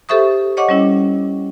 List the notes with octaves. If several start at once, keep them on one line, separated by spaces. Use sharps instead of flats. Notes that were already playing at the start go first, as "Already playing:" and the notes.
G4 A4 C5 E5 C#6 D#6
C#5 D#5 F#5 C#6 D6
G3 C#4 E4